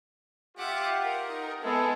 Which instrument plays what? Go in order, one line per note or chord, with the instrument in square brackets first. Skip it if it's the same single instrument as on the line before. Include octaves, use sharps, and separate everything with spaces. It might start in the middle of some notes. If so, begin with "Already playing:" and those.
[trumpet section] F4 G4 [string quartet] E5 F#5 D6
[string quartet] A#4 F#5
[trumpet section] D#4
[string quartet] G#3 B3 E4 [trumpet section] G#4 A4